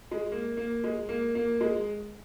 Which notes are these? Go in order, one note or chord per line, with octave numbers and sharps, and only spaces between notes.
G#3
A#3
A#3
G#3
A#3
A#3
G#3